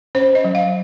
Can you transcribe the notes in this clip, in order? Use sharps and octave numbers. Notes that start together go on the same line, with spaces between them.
C#4 C5
D#5
F#3
F5